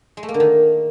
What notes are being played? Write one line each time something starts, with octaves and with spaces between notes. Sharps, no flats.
G#3
A3
A#3
D3
D#3